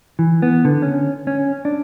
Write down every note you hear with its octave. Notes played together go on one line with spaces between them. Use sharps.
E3
B3
D3
C#4
C#4
D4